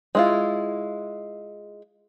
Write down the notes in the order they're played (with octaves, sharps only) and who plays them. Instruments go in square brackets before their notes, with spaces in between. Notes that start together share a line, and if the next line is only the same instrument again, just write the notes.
[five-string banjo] G#3 E4 F4